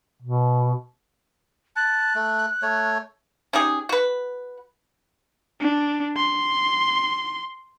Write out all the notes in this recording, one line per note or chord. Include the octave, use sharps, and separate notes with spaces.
B2
A5 F#6
A3
A3 C#5
C#4 D#4 G4 G#4
F#4 B4
D4
C6